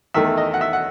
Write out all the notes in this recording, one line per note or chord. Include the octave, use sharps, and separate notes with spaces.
E2 D#3 A3 E5
D#5
F#5
E5
F#5